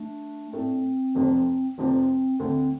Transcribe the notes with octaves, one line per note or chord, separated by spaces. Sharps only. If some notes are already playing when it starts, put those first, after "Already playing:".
Already playing: A3 D4
A2 A3 C4 D4 A4
F1 F2 C3 F3
F1 F2 C3 F3 C4
D2 D3 A3 C4